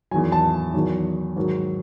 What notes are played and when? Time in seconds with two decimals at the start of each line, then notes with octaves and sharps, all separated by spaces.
0.11 E2 D#3 F#3 G#5
0.32 A5
0.74 E2 D#3 F#3
1.36 G#2 D#3 F#3